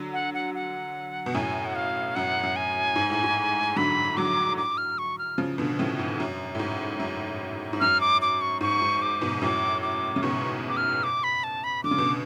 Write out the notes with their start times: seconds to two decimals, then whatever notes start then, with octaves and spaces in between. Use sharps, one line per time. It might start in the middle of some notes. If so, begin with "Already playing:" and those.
Already playing: D3 F#3
0.13 F#5
0.34 F#5
0.55 F#5
1.26 B2
1.34 F#2 A2 G#5
1.66 F#5
1.76 F5
2.15 F#2 F#5
2.43 F#2
2.56 G#5
2.96 G#2
3.10 A2
3.24 G#2
3.76 D3 F#3 B5
4.17 D3 F#3 D6
4.57 D6
4.78 F6
4.98 C#6
5.18 F6
5.38 C#3 F3
5.58 B2 D3
5.79 A2 C#3
5.99 G#2
6.20 F#2
6.55 A2
6.59 G#2
7.00 F#2
7.73 G#2
7.80 F#2 F6
8.01 D6
8.22 D6
8.41 C#6
8.61 G#2 C#6
8.82 G#2
9.02 D6
9.21 G#2 B2
9.41 F#2 A2 D6
9.82 D6
10.16 C#3
10.22 G#2 B2 C#6
10.69 D6
10.77 F6
11.03 D6
11.24 B5
11.44 A5
11.64 B5
11.84 D3 D6
11.91 C#3
11.98 B2 D3